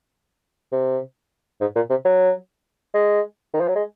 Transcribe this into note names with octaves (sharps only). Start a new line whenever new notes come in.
C3
G#2
A#2
C3
F#3
G#3
D#3
F3
F#3
G#3